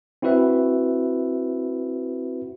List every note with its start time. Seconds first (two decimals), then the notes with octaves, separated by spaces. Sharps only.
0.22 C4 E4 F#4 B4 E5